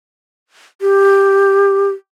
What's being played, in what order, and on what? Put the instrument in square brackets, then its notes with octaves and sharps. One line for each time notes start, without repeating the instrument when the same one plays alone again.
[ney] G4